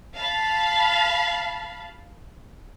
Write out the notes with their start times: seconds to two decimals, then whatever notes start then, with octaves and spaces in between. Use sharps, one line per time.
0.15 F5 A5 B5